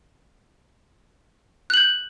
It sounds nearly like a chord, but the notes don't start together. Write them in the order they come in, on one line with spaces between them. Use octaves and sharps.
F#6 F#7 G6